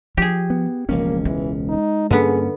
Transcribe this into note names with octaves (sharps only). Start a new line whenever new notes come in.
F3 G4 G#4
B3
E1 C#2 F3 A#3 C#4
E3 G#3
D#4
G2 D3 A#3 B3 C#4 G#4